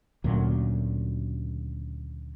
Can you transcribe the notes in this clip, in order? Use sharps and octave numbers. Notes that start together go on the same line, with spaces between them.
D2 A#2 C#3 F#3